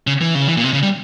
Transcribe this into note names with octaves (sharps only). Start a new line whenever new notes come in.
C#3
E3
C#3
E3
A#2
C3
C#3
G3